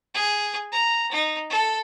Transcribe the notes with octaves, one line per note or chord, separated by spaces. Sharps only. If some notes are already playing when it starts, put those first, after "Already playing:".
G#4
A#5
D#4
A4